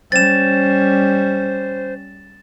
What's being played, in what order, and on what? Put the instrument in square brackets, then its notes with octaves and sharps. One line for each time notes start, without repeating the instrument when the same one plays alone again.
[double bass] G3 C#4 [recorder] C5 [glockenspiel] A6 E7